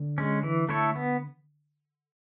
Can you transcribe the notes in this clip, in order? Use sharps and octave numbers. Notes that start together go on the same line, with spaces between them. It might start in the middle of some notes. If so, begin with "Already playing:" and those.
Already playing: D3
G#3 C#4
E3
A3 E4 A4 C#5
B3